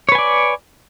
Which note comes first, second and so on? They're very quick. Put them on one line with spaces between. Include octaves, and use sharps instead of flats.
C#5 B4 G#5 D5